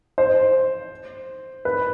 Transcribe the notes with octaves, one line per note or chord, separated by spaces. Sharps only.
C5
B4